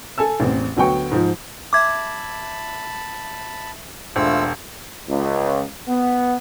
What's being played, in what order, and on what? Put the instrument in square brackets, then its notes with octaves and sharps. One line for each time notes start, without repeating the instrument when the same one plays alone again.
[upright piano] A4 G#5 A5 E6
A1 E2 C4
D2 F#3 B3 G5 C#6
G#2 F3
[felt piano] E5 [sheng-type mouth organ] A5 B5 [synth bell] D6 G#6
[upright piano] E1 [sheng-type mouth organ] A3 F4 E6 [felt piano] D4 C5
[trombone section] C#2
B3